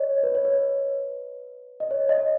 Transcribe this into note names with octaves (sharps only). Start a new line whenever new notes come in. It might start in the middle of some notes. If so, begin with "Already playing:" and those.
Already playing: C#5 D#5
B4
C#5
B4
D#5
C#5
D#5